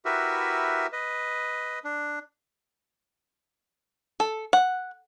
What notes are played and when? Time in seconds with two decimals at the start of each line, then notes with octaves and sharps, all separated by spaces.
0.05 E4 F#4 G4 A#4 B4 E5
0.93 B4 D#5
1.84 D4
4.20 A4
4.53 F#5